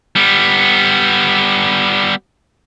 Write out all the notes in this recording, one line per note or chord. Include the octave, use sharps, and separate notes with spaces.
G3 B3